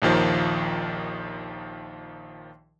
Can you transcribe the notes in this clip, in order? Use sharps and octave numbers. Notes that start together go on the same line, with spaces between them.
A#1 D#2 D#3 F3